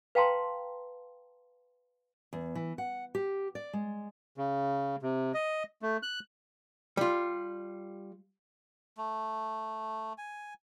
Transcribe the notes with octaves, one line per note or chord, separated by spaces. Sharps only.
B4 F5 G5 A5 A#5 C6
E2
E3
F#5
G4
D5
G#3
C#3
C3
D#5
A3
F#6
G3 F4
A3
G#5